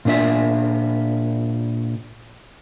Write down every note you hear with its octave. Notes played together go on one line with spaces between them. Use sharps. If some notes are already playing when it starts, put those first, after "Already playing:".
A#2 D4 E5